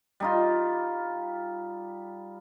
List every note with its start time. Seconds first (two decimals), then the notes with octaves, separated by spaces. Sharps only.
0.20 G3 D#4 F4